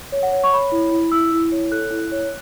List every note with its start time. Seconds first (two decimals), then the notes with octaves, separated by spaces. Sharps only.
0.12 C#5
0.23 F#5
0.32 C#5
0.44 C#6
0.53 C#5 B5
0.72 E4
0.92 E4
1.12 E4 E6
1.32 E4
1.52 C#5
1.71 A4 F#6
1.91 E4
2.12 C#5